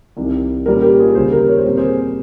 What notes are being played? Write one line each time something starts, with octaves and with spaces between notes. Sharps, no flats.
C2 C3 D#3 G3
A#2 G3 C#4 G4 A#4
G4 A#4
F4 G#4
D#2 C#3 G3 G#4 C5
G4 A#4
C#5
C5
A#2 G3 C4 A#4
G#4 C5